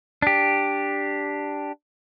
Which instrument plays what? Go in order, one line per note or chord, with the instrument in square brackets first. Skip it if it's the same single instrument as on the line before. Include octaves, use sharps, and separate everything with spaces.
[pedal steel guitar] D4 G4